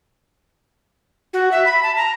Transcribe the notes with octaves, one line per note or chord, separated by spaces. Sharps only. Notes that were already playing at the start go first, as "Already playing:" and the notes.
F#4
E5
B5
A5
A#5